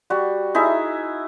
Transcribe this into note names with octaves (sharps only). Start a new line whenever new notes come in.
G3 F#4
D#4 E4 G#4 E5